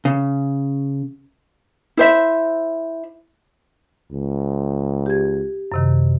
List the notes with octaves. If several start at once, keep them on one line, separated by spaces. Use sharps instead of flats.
C#3
E4 C5 E5
C#2
G4 G#6
F#2 C3 D#3